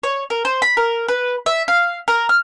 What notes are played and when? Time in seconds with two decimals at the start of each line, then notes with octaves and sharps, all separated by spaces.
0.03 C#5
0.30 A#4
0.45 C5
0.62 B5
0.77 A#4
1.08 B4
1.46 E5
1.68 F5
2.08 A#4
2.29 F6